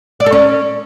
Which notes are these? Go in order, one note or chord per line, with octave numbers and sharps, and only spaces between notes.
D5
A4
C#4